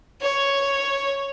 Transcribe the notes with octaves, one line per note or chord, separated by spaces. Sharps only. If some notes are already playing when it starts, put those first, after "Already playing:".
C#5